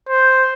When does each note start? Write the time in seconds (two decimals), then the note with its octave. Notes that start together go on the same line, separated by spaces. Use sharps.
0.09 C5